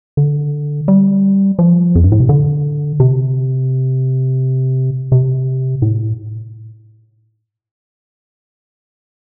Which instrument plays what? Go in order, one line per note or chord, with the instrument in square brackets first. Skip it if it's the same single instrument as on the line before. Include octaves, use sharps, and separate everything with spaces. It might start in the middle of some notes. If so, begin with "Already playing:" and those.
[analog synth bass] D3
G3
F3
F2
G2
A2
C3
D3
C3
C3
A2